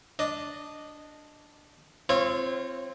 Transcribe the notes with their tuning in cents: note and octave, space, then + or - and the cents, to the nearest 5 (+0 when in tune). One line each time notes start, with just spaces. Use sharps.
D4 +0 D#5 -15
C4 +0 F4 -25 C#5 -25